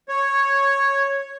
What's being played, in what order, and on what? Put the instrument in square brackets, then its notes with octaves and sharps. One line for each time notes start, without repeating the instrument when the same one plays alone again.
[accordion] C#5